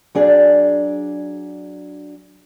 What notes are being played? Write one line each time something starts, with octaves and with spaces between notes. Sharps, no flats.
F#3 D4 G#4 D5